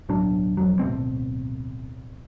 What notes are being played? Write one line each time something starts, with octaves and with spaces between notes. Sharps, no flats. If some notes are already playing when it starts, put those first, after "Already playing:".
D1 B1 F#3 D4
E1 F2 F#3
D1 B2 A3 C4